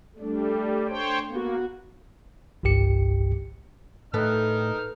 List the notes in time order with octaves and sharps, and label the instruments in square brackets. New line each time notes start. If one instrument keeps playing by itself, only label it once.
[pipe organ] G3 [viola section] A3 D4
[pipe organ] C5 C#5 G5
[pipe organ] A#3 [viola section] B3 F#4
[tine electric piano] G1 C2 G2 G4 C#7
[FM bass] A2 [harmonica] D#4 F6 [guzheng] A4 B4